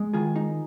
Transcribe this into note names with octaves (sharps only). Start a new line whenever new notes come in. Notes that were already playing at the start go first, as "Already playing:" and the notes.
Already playing: G#3
D#3 F4 G#4
D#4